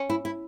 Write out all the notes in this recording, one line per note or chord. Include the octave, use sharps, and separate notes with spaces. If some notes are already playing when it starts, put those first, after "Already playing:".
Already playing: C#4
E4
E4